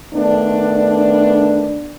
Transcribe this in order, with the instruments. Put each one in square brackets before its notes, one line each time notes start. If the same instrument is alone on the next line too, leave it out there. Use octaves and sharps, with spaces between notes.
[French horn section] D#3 A3 B3 D4